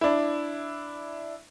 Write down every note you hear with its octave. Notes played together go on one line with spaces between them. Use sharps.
D4 E4